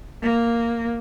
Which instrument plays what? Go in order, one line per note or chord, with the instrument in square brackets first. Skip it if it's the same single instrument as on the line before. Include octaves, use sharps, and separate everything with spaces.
[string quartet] A#3